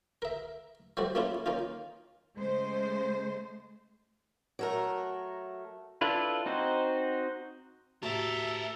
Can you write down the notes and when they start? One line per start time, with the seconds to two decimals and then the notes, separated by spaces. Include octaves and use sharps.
0.22 A#4 E5
0.97 F3 G3 A3 F#4
1.15 A3 A#3 C#4 D4 E4 F4
1.46 A#3 C#4 D#4 F4
2.35 C#3 G#3 A3 C5
4.59 F#3 A3 A#4
6.01 D4 E4 F4 A4 B4
6.46 C4 D#4 F#4 C5
8.03 A2 F#4 G4 A4 A#4 E5 A5